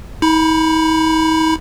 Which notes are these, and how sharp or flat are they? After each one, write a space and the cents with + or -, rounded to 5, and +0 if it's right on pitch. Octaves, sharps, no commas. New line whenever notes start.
D#4 +40 B5 +0